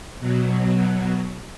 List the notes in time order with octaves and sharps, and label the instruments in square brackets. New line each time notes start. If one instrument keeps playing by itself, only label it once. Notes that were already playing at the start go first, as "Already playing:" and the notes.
[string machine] B2 F#3